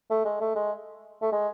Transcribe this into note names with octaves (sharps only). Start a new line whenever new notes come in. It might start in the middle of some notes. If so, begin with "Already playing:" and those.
A3
G#3
A3
G#3
A3
G#3